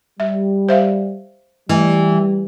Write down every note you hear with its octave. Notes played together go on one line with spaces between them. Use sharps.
G3 E5
C5 E5 F5
E3 G3 A3